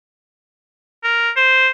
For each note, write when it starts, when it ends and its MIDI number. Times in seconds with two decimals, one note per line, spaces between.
1.04 1.30 70
1.37 1.70 72